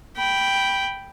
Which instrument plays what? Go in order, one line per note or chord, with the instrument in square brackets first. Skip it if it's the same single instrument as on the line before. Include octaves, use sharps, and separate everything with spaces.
[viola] G5 B5